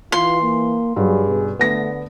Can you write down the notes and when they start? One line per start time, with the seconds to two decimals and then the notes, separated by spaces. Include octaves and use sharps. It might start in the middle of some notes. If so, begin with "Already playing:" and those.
0.12 E3 F4 C6
0.42 A#3
0.96 G2 C#3 F#3 G3 G#4
1.27 B2
1.59 D3 A3 B3 A#6